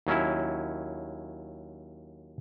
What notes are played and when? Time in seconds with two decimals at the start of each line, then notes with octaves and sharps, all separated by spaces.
0.07 D#2 F#3 C#4 E4